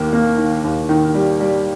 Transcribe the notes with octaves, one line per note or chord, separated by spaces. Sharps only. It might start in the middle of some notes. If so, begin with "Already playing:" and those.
Already playing: D#2 D#3 A#3
A#3
D#3
D#2
D#3
G3
G3